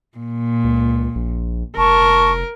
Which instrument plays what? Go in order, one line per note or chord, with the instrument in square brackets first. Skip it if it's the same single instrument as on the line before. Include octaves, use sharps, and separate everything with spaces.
[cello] A#2
[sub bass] C#2
A#1
[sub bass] F1 [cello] A#4 [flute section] A5 C#6